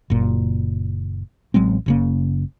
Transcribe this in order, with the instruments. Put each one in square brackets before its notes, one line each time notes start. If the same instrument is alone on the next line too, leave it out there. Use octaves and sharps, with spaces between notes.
[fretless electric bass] F#1 A#2
A1 F#3 G#3 C4
F#1 C#3 A#3